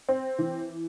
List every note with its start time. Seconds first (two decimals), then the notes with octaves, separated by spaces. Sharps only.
0.09 C4
0.39 E3